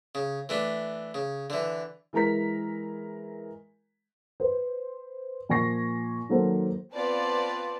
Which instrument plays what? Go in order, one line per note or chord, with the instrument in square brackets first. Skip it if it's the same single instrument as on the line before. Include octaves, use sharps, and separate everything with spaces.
[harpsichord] C#3
E3 A3 D4
C#3
D3 E3
[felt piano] E3 G#3 A#4 A#5 B6
[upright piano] B4 C5
A#2 F3 G#5 C#6 A#6 C7
D#3 F#3 A#3 A4 A#4 C5
[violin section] B3 C4 F4 B4 D5 A5